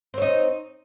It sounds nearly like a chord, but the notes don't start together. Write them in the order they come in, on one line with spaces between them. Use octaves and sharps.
C4 C#5 D#4